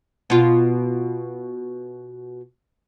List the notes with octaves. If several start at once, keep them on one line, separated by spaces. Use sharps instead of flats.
B2 F4